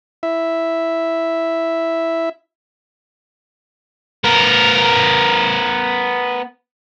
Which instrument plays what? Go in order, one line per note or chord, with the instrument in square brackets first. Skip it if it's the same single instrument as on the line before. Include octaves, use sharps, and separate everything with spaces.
[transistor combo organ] E4 E5
[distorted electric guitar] B3 A#4